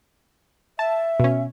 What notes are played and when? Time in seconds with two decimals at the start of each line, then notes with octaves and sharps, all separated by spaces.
0.79 E5 A5
1.20 B2 C#4